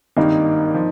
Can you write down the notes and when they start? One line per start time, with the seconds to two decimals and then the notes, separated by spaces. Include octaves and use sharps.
0.17 G#1 G2 D#3 A#3 D#4
0.74 F3